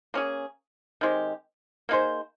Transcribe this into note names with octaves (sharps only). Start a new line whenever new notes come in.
A#3 C#4 G#4
D#3 G#3 C4 G4
A#3 D#4 G#4 C5